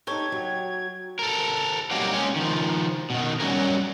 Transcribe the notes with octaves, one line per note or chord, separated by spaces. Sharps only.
D#4 G4 A4 C#5 G#6
F#3
A4 A#4
F#3 G3 A#3 C4 D#4 G4
G#3 C#4
D#3 F3
B2 D#3
F#3 G3 C#4 G#4 A#4